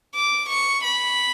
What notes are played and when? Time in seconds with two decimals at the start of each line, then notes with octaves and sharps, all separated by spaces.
0.15 D6
0.49 C#6
0.84 B5